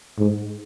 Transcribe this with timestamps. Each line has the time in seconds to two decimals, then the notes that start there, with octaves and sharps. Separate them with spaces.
0.18 G#2